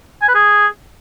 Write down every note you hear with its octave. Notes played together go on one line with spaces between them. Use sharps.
G#5
B4
G#4